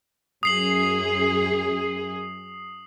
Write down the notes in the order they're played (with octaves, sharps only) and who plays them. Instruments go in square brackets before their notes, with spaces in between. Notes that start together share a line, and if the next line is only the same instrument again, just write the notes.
[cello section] F#2 G#4 [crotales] D#6 C7 F#7